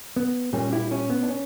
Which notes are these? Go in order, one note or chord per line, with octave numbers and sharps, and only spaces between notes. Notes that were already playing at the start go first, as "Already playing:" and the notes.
B3
A#2 G3 A#3 C#4
E4 G4
C#4
B3
D4
C#4